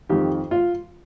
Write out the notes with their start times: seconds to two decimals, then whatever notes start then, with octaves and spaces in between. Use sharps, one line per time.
0.09 F2 D#3 G4
0.51 F4